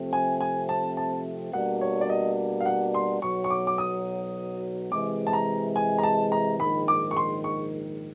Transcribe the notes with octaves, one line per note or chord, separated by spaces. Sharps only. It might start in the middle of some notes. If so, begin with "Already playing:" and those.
Already playing: C3 F3 A3 C4
G#5
G#5
A5
A5
B2 G3 A#3 D4 F#4 F#5
C#5
D5
D#5
F5
F#5
C6
B1 B2 F#3 C#6
C#6
D6
D6
D#6
C3 E3 G#3 D6
A5
A#5
G#5
A#5
A5
A#5
A#1 G#2 D#3 B5
D6
C#6
C6
C#6